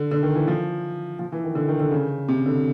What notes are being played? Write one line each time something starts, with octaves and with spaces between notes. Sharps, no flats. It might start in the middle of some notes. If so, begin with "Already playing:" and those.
Already playing: D3
D3
D#3
E3
F3
F3
E3
D#3
D3
D#3
D3
C#3
C3
D3